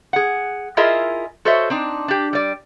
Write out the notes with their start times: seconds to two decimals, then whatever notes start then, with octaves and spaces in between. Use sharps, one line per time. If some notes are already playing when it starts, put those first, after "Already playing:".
0.13 G#4 F#5
0.77 E4 F4 G#4 A#4 D#5 E5
1.45 F#4 A4 C5 C#5 D#5 E5
1.70 C4 D4 D#4
2.08 D4 G4
2.33 G3 D5